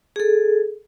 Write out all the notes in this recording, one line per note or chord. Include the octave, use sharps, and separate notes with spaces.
G#4 A4